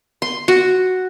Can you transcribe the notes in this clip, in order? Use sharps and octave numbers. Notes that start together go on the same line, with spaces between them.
C6
F#4